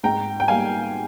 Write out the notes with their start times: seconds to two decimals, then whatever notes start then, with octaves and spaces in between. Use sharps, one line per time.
0.03 G#2 G5 A#5
0.40 G5
0.48 G3 A#3 F5 G#5